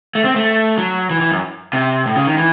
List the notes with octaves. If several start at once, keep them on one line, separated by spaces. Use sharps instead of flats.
A3
C4
A3
F#3
E3
E3
F#2
C3
A2
C#3
D#3
E3